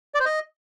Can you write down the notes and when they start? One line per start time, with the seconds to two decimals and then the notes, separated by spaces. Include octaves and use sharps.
0.15 D5
0.20 C5
0.26 D#5